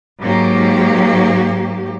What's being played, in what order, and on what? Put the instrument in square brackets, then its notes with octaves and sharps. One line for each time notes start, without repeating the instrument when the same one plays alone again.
[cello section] G#2 F#3 A#3 G4